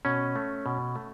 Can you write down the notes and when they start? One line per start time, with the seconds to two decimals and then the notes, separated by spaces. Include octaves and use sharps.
0.05 B2 C#4
0.36 A3
0.66 B2
0.96 A3